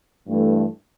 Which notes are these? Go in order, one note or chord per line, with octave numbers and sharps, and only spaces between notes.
G2 E3 A3